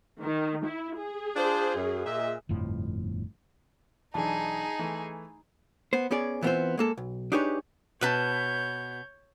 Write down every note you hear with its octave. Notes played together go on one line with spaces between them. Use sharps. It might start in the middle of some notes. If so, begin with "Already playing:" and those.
D#3
E4
G#4
D4 F4 C5
F#2
A#2 D#5 E5
G1 F2 A2 F3
B1 E3 D4 D#4 G#4 A5
E3 A3
B3 C5
B3 C#4 G#4 D5
E3 G3 B3 C4 F4 C5
G#3 A#3 A4
B1
D4 D#4 G4 G#4 B4 C#5
B2 B4 C#5 A5 G6